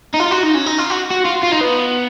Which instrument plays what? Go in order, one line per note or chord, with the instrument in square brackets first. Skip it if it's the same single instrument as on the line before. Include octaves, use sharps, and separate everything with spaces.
[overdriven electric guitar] D#4
F4
F#4
D#4
C#4
D#4
F4
F#4
F#4
F4
F4
D#4
B3